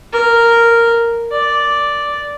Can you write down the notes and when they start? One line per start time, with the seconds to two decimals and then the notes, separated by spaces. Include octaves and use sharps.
0.13 A#4
1.32 D5